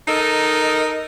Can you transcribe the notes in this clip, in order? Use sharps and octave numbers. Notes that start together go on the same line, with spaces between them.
D#4 A4 A#4 D#5